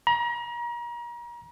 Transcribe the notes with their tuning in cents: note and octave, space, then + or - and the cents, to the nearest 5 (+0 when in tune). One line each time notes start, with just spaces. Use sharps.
A#5 +35